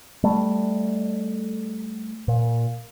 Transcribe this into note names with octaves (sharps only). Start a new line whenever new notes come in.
G3 A3
A#2